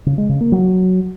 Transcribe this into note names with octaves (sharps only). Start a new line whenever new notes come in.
C#3
G#3
C#3
A#3
F#3